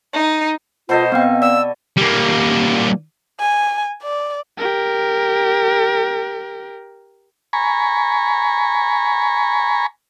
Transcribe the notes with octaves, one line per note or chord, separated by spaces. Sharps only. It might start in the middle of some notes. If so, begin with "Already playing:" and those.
D#4
B2 F4 A4 C5 D#5
B3 C4 F5 G5
D5 E6
G3 A#3
G#5
D5
G4 A#4
G#5 A#5 B5 C#6